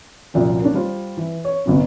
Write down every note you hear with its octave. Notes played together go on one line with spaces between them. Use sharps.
C2 F#2 A#2 F3 C4
A#3 C#4 D4
G3 F4 C5
E3
C#5
G1 C2 F#2